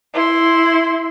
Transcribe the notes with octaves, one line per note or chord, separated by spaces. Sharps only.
E4 C6